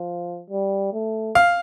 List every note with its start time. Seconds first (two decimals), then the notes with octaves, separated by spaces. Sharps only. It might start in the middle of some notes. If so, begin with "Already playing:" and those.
Already playing: F3
0.50 G3
0.93 A3
1.35 F5